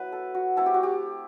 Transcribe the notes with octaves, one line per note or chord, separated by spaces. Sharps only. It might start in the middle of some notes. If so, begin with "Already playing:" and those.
Already playing: F#3 B3 E4 B4
A4
F#4
A3 C4 E4 A4
G4
F#4
G4